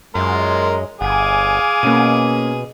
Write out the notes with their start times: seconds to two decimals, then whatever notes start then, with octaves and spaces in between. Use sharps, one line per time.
0.15 F#2 G#3 A#4 C6
1.01 G1 G#4 F5 F#5 G#5 D6
1.83 B2 A#3 C#4 D#7